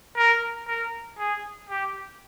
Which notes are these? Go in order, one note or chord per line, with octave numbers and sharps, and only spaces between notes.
A#4
A#4
G#4
G4